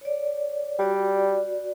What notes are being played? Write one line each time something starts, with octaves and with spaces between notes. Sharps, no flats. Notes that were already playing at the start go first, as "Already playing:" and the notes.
C#5 D5
G3 F#4 D5